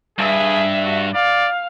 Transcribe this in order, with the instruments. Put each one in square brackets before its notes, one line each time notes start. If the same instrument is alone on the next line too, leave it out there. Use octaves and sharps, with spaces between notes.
[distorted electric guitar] G2 [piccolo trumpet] G#4 [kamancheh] E5
[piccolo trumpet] F#4
[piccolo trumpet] D5 [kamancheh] F5